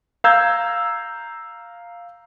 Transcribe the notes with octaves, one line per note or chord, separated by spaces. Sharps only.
F5 A#5 E6 G6 G#6